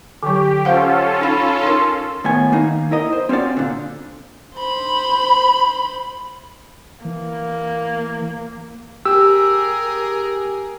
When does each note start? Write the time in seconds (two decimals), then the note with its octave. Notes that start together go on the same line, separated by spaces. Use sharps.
0.23 D3 F#3 G4 D6
0.65 C#4 F4 A4 C5 F5 F#5
1.21 D#4 B5
1.63 D#4 A#4 C6
2.24 D#2 A2 B3 G#5
2.52 D#3 A#3 D#4
2.91 E4 A#4 D#5
3.13 C5
3.29 C4 C#4 F4 F#4 D5
3.57 A#2 D3
4.57 C5 B5
7.05 E3 A#3
9.05 G4 G#4 A#4 E6